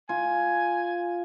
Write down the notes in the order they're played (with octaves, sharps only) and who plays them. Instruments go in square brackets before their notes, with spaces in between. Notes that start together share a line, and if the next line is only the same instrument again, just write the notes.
[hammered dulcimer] F4 [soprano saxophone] G#5